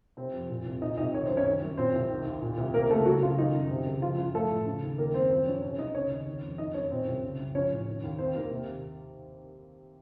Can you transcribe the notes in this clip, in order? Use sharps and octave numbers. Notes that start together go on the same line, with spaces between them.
C3 C4 C5
F2
A#2
C2
A#2 D#4 D#5
C2 D#4 D#5
D#3 C#5
F#2 C5
C#4 C#5
D#3
F#2
A#2 C4 C5
C2
D#3
D#2
A#2
C2
C3 A#3 A#4
C#2 A3 A4
C#3 F#3 F#4
C#2 F4
D#3 D#4
F#2
C3
C#2
F3 F4
F#2 F4
F3 A3 A4
A2
C#3
D#2
D#3 A#3 A#4
F#2 C4 C5
F3 C4 C5
F#2 C#4 C#5
C3 C#4 C#5
C2 D#4 D#5
C#3 C#4 C#5
D#2
D#3
F2
D#3 D#4 D#5
F#2 C#4 C#5
A#2 C4 C5
C2
C#3
F#2
F3 C#4 C#5
A2
D#3
D#2
D#3 C4 C5
D#2 A#3 A#4
C3